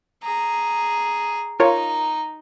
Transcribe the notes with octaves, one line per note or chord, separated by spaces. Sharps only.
G#4 A#5
D#4 F4 A#4 C#5 A#5